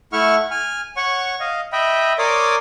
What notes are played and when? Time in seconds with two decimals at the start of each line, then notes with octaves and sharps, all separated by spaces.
0.13 A3 E4 E5 F#5 C#6 F6
0.51 G#5 F6
0.96 C#5 F#5 C#6
1.40 D#5 F5
1.73 D#5 E5 G5 B5
2.19 A#4 C#5 D5 C6 D6 D#6